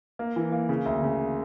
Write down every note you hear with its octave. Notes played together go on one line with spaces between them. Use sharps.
A#3
E3
A#3
C#3
D2
C#3